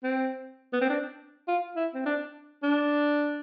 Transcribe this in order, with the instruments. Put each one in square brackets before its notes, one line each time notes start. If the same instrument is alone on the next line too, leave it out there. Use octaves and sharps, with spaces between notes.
[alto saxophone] C4
B3
C4
D4
F4
E4
C4
D4
D4